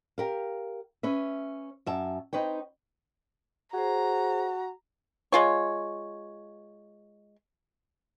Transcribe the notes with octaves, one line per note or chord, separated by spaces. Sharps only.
G4 A#4 F5
C#4 B4 E5
F#2 E5 A5
C4 D#4 B4 C#5 G5
F#4 G#4 C5 A#5
G#3 F4 C#5